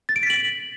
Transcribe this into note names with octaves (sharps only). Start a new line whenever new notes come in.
A6
D7
B6
F#7